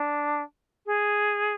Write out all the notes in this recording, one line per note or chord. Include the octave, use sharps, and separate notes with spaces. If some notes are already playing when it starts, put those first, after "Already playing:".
Already playing: D4
G#4